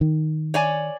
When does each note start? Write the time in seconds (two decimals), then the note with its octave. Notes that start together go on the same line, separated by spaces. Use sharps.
0.01 D#3
0.54 C#5 D5 G#5